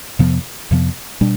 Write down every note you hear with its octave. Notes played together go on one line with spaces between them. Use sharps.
F2 C3 F3 B3
F2 C3 F3 B3
B2 G3 D4